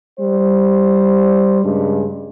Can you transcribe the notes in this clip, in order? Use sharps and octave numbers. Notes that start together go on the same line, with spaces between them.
G3 C5
G2 C#3 G#3